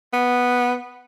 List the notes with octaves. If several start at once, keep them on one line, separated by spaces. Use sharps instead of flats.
B3